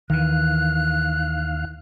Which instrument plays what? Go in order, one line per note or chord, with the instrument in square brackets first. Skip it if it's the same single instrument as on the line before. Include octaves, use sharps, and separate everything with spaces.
[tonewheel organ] D#2 F5 [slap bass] D#3 E3 [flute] F#6